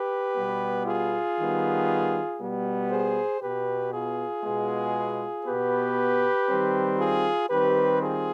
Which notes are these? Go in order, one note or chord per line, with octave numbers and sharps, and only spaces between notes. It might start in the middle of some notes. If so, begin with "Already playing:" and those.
Already playing: G4 B4
B2 G3 B3
F4 G#4
D#3 G3 B3
B2 G3 B3
G#4 C5
B2 B3 G4 B4
F4 G#4
B2 G#3 B3
B2 B3 G4 B4
D#3 G3 C4
F4 G#4
D#3 G3 C4 G4 B4
F4 G#4